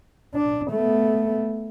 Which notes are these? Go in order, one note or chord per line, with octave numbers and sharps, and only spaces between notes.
D4
A3 B3